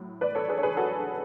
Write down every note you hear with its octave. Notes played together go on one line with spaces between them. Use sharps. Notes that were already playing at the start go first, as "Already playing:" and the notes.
Already playing: A2 F#3
B4 D5
A4 C#5
G#4 B4
C#5
G#4 B4
F#4 A4